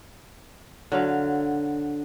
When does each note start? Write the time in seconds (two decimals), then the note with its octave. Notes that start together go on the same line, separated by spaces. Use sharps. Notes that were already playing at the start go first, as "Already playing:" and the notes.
0.92 D3 F#3 F5